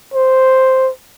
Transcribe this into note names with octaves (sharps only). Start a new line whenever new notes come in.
C5